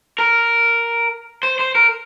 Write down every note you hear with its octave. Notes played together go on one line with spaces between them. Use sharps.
A#4
C5
C5
A#4